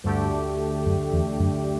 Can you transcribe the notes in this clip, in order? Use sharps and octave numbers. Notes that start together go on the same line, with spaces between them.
D2 G2 D3 A3 D4 G4
F#2
E2
F#2